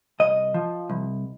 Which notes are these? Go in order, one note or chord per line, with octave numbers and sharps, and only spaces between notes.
C2 D#5
F3
C2